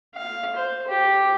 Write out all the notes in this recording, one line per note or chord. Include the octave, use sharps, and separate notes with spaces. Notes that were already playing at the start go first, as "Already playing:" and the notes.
F5
C5
G4